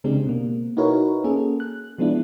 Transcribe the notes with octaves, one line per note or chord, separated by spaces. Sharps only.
C#3 G#3 C4 D4 G4
B2 A#3
D#4 E4 F#4 A#4 B4 C#5
A#3 C#4 G#4 A4
F#6
F3 G#3 B3 D4 E4